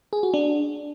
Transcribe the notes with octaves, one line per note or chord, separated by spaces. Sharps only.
G#4
F#4
D4